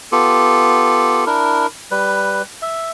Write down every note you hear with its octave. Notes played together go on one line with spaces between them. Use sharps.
B3 F4 G4 A4
D4 E4 A#4
G3 B4
E5